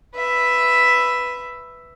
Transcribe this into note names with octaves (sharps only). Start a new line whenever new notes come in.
B4 E5